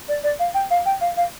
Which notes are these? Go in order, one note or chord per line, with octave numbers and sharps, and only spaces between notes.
D5
D5
F5
G5
F5
G5
F5
F5